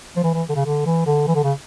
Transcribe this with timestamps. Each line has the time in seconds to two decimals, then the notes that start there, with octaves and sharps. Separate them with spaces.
0.16 F3
0.23 E3
0.34 E3
0.49 D3
0.55 C#3
0.66 D3
0.86 E3
1.06 D3
1.27 E3
1.35 D3
1.44 C#3